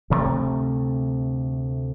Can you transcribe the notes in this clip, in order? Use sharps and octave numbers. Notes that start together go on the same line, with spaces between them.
D2 C3 A3